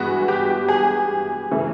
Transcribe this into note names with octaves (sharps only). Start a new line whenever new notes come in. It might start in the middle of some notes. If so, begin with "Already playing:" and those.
Already playing: G2 E3 G#3 B3 F#4
G4
G#4
C#3 E3 A3